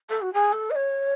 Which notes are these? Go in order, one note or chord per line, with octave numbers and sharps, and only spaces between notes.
A4
F#4
G#4
A4
D#5
C#5